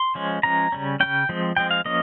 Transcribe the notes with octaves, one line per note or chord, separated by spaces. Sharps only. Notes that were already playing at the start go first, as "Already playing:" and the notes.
Already playing: C6
F3 G#3 C#4
F3 G#3 C#4 A#5
C#3 G3 C#4
G3 C#4 G5
C#3
F3 G#3 C4
F3 G#3 C4 G5
F5
F3 A#3 C#4 D#5